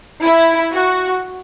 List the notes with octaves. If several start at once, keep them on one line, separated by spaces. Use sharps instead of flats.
E4
F#4